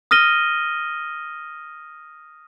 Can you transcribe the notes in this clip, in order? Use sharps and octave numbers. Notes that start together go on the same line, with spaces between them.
D#6 F6 A#6 D#7 G7